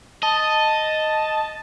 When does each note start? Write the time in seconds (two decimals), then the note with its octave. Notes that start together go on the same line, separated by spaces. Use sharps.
0.23 D#5 A5